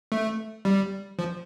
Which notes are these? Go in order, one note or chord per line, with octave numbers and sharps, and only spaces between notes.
A3
G3
F3